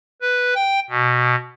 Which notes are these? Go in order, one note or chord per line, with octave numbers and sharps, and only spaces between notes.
B4
G5
B2